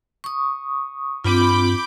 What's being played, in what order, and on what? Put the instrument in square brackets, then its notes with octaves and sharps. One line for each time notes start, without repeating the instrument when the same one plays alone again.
[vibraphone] C#6 D#6
[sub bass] G2 [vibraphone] C4 F4 [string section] B5 D6 G6